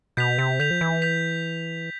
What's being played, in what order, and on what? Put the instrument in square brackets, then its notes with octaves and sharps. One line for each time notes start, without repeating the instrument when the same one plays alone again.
[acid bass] B2 [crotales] G6 B6 F7
[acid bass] C3
[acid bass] D3 [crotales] G6 B6 F7
[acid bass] F3
E3
[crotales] G6 B6 F7